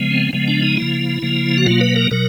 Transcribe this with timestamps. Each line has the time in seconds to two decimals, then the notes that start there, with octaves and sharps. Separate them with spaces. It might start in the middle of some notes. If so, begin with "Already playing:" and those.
Already playing: C#3 F3 G#3 B3
0.11 C4
0.33 C#3 F3 G#3 B3
0.48 D4
0.63 D#4
0.77 C#3 F3 A#3 E4
1.22 C#3 F3 A#3
1.58 F#4
1.66 B2 F#3 A#3 F4
1.81 B4
1.96 A#4
2.11 B2 F#3 A#4